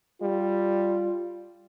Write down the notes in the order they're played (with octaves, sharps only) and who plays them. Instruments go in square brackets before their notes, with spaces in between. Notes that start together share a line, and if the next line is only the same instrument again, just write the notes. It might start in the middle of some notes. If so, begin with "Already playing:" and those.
[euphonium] G3 [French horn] F4